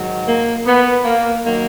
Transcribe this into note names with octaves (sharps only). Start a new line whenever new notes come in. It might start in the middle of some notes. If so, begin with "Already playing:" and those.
Already playing: G#2 D#3 F#3
A#3
B3
A#3
D#3 F#3 A#3